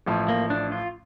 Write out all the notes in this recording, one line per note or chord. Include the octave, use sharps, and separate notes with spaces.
A1 A2 F3
A#3
D4
F4